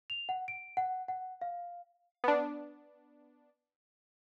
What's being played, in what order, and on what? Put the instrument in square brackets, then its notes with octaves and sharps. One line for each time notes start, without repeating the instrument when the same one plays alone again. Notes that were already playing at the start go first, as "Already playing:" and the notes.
[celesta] F7
F#5
D7
F#5
F#5
F5
[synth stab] B3 D4